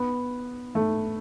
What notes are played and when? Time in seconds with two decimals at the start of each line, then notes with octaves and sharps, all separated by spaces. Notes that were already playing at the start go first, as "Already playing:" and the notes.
Already playing: B3
0.75 A3